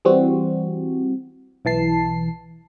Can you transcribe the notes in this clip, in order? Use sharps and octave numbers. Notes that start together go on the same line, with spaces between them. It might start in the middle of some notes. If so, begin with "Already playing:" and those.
E3 G3 C4 F#4
B1 E3 A5 C7